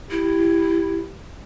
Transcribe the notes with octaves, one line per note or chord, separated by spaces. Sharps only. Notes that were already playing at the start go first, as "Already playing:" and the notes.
E4 G4